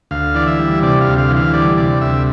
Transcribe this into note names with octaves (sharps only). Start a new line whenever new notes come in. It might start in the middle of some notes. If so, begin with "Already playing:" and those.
D2 F5
E3 D5
E5
G3
C3 D5
F5
D2
F5
E3
F5
G3 D5
C3 D5
D2 E5